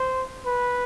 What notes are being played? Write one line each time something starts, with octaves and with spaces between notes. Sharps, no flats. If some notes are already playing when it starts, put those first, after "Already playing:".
Already playing: C5
B4